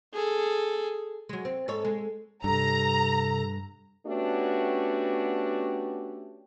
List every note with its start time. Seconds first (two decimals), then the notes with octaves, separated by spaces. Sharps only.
0.13 G#4 A4
1.29 F#3 G#3
1.45 C4
1.68 G#2 A4 C#5
1.85 G#3
2.44 G2 C3 A4 A#5
4.07 A3 B3 C#4 D4 F#4 G4